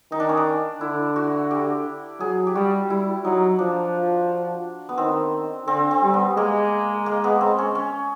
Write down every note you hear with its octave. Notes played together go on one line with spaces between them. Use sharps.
D#3 D#4
D4
C#4
D4
D3 E4
F#4
G4
F#3 G#4
G4
G3 F#4
G3 E4
F#3 D#4
F3 D4
B3
D#3 C4
D3 C4
C4
G3
B3
G#3 A#3
A#3
B3
C4
C#4
C#4